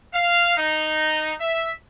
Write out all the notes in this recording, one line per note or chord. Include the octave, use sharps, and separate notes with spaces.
F5
D#4
E5